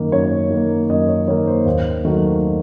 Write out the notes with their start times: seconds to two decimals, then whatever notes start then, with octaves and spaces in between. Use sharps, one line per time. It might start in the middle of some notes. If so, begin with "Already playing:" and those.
Already playing: F#2 D#3 A#3
0.12 F#2 C#5
0.50 D#3 A#3
0.89 F#2 D#5
1.08 C#5
1.28 D#3 A#3 C#5
1.47 C5
1.66 D#2
2.05 D#3 F#3 A3